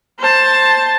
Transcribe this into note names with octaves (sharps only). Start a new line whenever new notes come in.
C5 A5